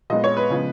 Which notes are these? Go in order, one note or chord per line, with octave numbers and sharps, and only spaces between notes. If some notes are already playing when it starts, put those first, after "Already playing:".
A#2 G#3 B3 D#5
C#5
B4
C#3 F3 G#3 B3